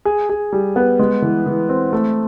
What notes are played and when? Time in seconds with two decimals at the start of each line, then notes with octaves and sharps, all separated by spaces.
0.05 G#4
0.29 G#4
0.53 G3
0.76 B3
0.99 G#3
1.22 E3
1.46 E3
1.69 C4
1.93 A3